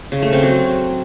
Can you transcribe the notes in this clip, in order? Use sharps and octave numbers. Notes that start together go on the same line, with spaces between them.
C#3
A3
C4
F#3